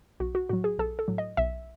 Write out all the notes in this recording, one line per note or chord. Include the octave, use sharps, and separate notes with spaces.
B1 F#4
F#4
A2 F#3 F#4
G#4
B1 A4
A4
A2 F#3
D#5
B1 E5